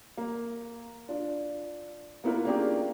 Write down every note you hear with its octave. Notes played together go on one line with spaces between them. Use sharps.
A#3
D4 F4
A#3 B3 E4 F4 A#4
A#3 C#4 D4 F4 G4 G#4